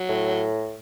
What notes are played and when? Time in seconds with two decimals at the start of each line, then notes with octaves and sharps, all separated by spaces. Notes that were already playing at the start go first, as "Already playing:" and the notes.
Already playing: F#3
0.09 A2